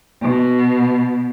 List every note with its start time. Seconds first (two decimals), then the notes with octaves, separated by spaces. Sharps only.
0.22 B2